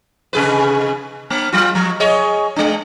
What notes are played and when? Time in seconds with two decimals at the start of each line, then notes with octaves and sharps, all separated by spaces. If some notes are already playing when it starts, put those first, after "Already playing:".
0.33 C3 G#4 B4
1.30 A#3
1.53 F#3 F4
1.75 F3
2.00 G#4 C#5 D#5
2.56 G#3 D4